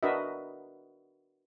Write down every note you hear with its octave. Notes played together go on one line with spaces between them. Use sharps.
D4 F#4 A#4 B4 D#5 E5